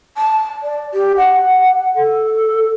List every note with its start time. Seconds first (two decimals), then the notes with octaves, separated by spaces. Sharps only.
0.17 A5
0.63 D5
0.93 G4
1.17 F#5
1.95 A4